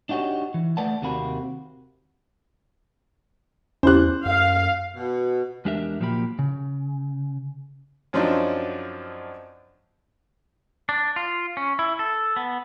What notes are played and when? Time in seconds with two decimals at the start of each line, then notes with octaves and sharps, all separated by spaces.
0.09 D4 D#4 F#4 G4 C#5
0.54 E3
0.77 A3 B4 D5 F#5 A5
1.02 D#2 C3 A#3 C4 F#4 B5
3.83 E2 C#4 E4 G4 C5 F#6
4.25 F#2 F5
4.96 B2
5.65 E2 G#3 D4 G4 A#4 E5
6.00 A#2 F3 F#3 A#3 G4 B5
6.39 C#3
8.13 F#2 F3 F#3 C4 D4 D#4
10.89 D4
11.16 F4
11.57 C#4
11.79 E4
11.99 A4
12.36 B3